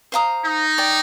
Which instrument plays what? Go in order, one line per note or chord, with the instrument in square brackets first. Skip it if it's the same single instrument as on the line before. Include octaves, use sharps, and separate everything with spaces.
[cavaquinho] C5 F5 A#5 D#6
[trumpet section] D#4
[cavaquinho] D5 G5 D6